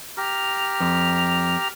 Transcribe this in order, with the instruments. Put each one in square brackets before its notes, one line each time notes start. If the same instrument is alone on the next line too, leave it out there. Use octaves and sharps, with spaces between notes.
[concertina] G4 A#5 F6
[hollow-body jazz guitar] F2